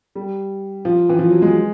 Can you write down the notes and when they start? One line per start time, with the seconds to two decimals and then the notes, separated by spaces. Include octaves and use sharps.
0.15 G3
0.85 F3
1.09 E3
1.19 F3
1.30 F#3
1.42 G#3